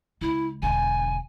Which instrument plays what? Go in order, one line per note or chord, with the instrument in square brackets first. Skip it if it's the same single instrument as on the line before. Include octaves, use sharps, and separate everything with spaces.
[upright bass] C#2 [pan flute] E4
[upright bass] E1 D3 [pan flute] G#5